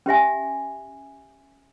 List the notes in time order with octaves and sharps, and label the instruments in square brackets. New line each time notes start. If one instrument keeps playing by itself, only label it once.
[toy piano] C#4 G4 E5 G#5